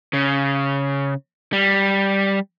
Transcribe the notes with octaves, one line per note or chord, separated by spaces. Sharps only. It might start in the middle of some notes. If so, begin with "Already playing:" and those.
C#3
G3